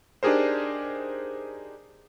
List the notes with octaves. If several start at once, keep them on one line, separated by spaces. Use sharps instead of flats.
D4 D#4 G4 G#4 A#4 C5